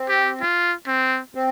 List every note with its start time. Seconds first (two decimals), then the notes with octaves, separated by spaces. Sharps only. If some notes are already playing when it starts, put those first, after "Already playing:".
Already playing: C4
0.08 G4
0.41 F4
0.87 C4
1.35 C4